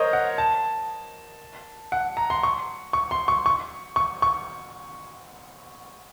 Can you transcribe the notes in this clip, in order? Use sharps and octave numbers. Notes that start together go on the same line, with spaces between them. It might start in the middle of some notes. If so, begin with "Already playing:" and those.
Already playing: A#4 C5 C#5 D#5
F#5
A5
F#5
A#5
C6
C#6
C#6
C6
C#6
C#6
C#6
C#6